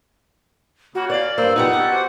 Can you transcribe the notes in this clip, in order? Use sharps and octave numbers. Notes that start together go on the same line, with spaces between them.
C#3 A#3 F#4
C#5 D5 F5
G2 A#3 C5 E6
F2 B2 G3 D#4 F#5
B3 C#4 G4 A4
F#4 C5 D6